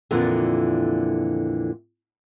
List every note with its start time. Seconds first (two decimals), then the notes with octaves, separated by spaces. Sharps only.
0.11 F2 A#2 D3 E3